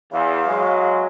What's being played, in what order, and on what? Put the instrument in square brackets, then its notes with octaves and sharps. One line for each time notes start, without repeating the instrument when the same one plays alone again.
[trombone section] E2 [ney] F5
[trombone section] F#3 G#3